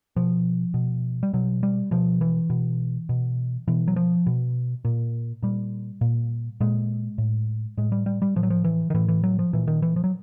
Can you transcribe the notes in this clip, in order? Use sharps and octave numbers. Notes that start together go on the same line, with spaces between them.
B2 F3
B2
G3
B2 F#3
G3
B2 F3
E3
B2
B2
B2 E3
F#3
F3
B2
A#2
A#2 G3
A#2
A#2 G#3
A2
A2 G#3
G3
G3
G3
A2 F3
F#3
F3
E3
D#3
A2 E3
E3
F#3
F3
A#2 E3
D#3
E3
F3
F#3